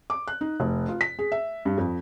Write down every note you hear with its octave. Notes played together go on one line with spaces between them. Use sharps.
D6
F#6
D#4
F1
F4
B6
G#4
E5
G2
F2